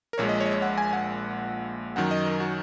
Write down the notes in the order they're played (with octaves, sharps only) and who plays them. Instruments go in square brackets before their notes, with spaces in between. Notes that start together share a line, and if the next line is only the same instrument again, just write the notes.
[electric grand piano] A#4
A#1 A#2 G#3 C#5
D#5
C#5
D#5
C#5
F#5
G#5
F#5
F#2 D#3 F#3 F#5
D#5
A#4
F#4